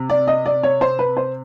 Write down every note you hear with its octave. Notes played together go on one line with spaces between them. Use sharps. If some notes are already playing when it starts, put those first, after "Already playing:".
Already playing: C3
D5
D#5
D5
C#5
C5
B4
C5